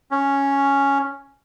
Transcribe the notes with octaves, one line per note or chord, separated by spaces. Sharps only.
C#4